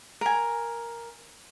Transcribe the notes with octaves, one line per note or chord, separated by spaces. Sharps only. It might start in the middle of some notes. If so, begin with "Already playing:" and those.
A#4 G#5